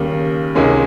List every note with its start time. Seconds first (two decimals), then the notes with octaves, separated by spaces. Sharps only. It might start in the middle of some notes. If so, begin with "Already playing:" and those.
Already playing: D#2 C#3 G3 A#3
0.55 C#2 C3 D#3 G#3 C#4